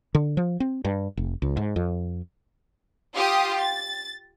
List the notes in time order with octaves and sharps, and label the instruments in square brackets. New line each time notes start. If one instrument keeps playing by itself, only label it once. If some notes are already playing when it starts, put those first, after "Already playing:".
[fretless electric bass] D3
F3
C4
G2
F1
C#2
G#2
F2
[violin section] F4 G4 D#6
A6